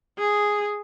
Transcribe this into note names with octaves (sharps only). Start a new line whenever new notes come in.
G#4